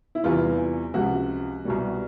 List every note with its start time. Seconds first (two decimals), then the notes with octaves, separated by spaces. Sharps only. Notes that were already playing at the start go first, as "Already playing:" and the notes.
0.15 E4
0.23 E2 C3 E3 G3 F4
0.94 C#2 C3 F3 F#4
1.65 C2 B2 G3